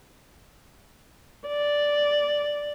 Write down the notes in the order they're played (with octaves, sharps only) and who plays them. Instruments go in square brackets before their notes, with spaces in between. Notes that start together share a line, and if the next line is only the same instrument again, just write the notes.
[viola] D5